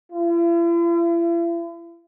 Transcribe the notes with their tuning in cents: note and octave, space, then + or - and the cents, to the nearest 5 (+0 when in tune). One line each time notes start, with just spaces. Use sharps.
E4 +45